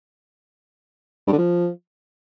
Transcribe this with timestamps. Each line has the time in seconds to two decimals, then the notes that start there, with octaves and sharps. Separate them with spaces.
1.27 G2
1.32 D3
1.38 F3